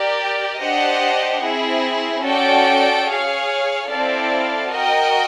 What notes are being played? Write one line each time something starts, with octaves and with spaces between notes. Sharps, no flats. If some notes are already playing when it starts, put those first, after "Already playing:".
Already playing: G4 A#4 D5
D4 G4 C5 D#5 F#5
C4 E4 G#4
C#4 F#4 A4 D5 G5
G#4 C#5 F5
C4 E4 A4 D5 F5
F#4 A#4 D#5 G5